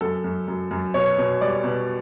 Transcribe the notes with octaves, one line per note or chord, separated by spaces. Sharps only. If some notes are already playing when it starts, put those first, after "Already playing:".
F#2 A4
F#2
F#2
F#2
B2 C#5
B2
G3 D5
B2